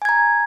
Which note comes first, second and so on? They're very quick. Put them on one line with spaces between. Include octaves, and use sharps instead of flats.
G#5 G#6 A#5